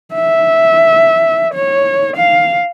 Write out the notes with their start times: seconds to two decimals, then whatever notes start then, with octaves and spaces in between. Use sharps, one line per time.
0.14 E5
1.54 C#5
2.17 F5